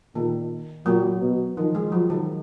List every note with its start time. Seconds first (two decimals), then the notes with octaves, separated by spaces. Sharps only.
0.15 A#2 D#3
0.86 A#2 F#3
1.21 B2
1.57 D#3 F3
1.75 G#3
1.92 F3 F#3
2.10 D#3